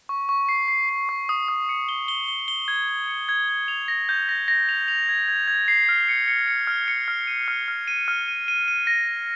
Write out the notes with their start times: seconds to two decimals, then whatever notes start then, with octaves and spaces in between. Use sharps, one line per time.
0.09 C#6
0.29 C#6
0.49 C7
0.68 C7
0.89 C7
1.09 C#6
1.29 D#6
1.48 D#6
1.69 C#7
1.89 G7
2.08 G7
2.28 G7
2.48 G7
2.68 G#6
2.88 G#6
3.08 C#7
3.29 G#6
3.49 G#6
3.68 F7
3.88 A#6
4.09 G6
4.29 A#6
4.48 A#6
4.69 F7
4.88 F7
5.09 G#6
5.28 G#6
5.48 G#6
5.68 C7
5.89 F6
6.09 C#7
6.28 C#7
6.48 C#7
6.67 F6
6.88 C#7
7.08 F6
7.27 D#7
7.48 F6
7.68 F6
7.88 D#7
8.08 F6
8.28 D#7
8.48 D#7
8.68 D#7
8.87 A#6
9.08 D#7